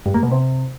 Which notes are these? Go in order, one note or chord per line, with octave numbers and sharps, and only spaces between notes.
G2
A#3
B2
C3